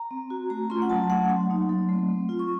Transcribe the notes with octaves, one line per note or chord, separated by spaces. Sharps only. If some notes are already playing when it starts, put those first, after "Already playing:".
Already playing: A#5
C4
F#4
A3 A#5
C#4 F4 C6
F#5
F#3 A5
A3 C#4 F#5
F#3 C6
A#3 D#4
F#3
A3 C4
C4
F4
C#6